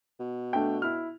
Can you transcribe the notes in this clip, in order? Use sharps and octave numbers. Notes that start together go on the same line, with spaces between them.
B2
A3 D4 G5
E4 F6